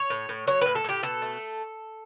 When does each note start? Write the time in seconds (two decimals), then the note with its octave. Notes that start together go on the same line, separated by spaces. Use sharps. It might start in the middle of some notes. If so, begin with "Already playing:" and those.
Already playing: C#5
0.10 A2
0.29 A2
0.47 F#3 C#5
0.61 A2 B4
0.75 A4
0.84 A2 G4
1.03 B2 A4
1.22 A3